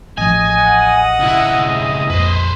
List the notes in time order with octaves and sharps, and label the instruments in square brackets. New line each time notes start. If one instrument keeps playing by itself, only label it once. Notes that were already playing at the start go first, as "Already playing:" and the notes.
[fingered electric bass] A1 F3 [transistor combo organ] D#5 [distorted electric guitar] G#5
[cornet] F#5
[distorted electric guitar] C#2 E4
[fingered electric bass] A#1 F2 [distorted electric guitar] B4 C5